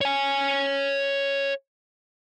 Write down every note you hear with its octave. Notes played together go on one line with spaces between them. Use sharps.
C#5 G#5